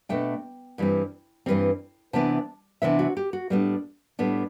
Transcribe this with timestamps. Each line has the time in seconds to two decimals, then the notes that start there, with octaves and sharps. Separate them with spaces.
0.09 B2 A3 D4 G5
0.78 G2 E3 G3 C4
1.46 G2 E3 G3 C4
2.13 C3 E3 B3 D4 A5
2.82 C3 E3 B3 D4 E5
2.99 F#4
3.17 G4
3.33 F#4
3.50 A2 G3 B3 D4
4.19 A2 G3 B3 D4